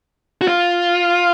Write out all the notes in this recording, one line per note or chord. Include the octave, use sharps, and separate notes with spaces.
F#4
F4